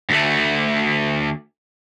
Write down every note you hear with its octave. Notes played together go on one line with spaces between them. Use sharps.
D2 A3